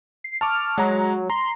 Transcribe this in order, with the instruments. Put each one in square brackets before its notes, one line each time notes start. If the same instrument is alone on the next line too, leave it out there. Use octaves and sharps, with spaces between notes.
[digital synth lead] C7
[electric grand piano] A5 C#6 D6 [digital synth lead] F6
[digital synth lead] F#3 [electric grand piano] G#3 C#5 A#5
[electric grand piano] A#5 [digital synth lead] C6